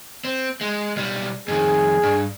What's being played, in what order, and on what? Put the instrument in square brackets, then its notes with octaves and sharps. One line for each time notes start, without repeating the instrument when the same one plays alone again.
[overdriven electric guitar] C4
G#3
B1 G3
[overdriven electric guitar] F2 D#3 [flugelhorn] G#4
[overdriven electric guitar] G2